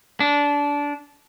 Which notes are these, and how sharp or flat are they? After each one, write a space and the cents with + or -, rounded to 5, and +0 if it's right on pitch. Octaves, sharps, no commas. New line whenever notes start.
D4 -20